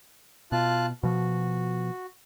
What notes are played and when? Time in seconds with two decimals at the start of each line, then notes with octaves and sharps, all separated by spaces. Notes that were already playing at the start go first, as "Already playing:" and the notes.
0.52 B2 F4 A5 F#6
1.03 B2 F3 F#4